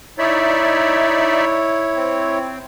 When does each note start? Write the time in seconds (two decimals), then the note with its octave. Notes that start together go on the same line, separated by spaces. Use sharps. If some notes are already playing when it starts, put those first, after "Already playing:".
0.18 D#4 E4 C#5 D5 E5
1.96 C4